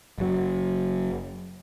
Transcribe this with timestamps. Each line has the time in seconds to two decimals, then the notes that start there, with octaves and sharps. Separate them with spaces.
0.18 F#1 F#3